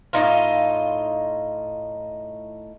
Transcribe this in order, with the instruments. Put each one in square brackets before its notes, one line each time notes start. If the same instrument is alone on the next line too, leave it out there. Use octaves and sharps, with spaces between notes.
[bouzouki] A2 D#4 F4